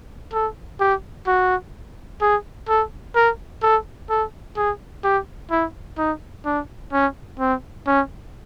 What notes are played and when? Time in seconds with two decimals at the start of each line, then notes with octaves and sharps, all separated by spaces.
0.33 A4
0.80 G4
1.27 F#4
2.21 G#4
2.68 A4
3.15 A#4
3.62 A4
4.10 A4
4.57 G#4
5.04 G4
5.51 E4
5.98 D#4
6.45 D4
6.92 C#4
7.40 C4
7.87 C#4